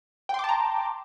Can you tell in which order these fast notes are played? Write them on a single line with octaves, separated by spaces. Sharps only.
G5 C6 D6 A5 A#5